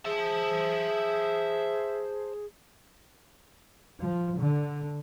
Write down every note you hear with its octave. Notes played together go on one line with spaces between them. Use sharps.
G#4 C5 E5 A5
F3
D3